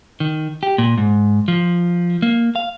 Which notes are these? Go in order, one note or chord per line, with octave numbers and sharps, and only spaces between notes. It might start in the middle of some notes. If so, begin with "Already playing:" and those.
D#3
G4
A#2
G#2
F3
A#3
F5